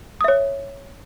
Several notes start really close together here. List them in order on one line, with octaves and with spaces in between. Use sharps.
D#6 E5 C#5